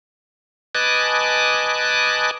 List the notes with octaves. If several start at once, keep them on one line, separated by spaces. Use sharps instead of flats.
B4 D#5 G#5 A5 D6 F#6